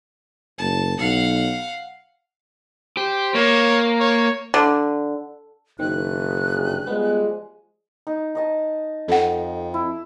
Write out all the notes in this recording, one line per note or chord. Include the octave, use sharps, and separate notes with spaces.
F#1 A5
B1 F5 F#5
G4 C5
A#3 C#5
C#5
D3
F#1 D#3 C4 F#6
G2 C3 G#4
F3 G3 G#3 B3
D#4
D#4 D#5 A5
F2 A4 F#5
E4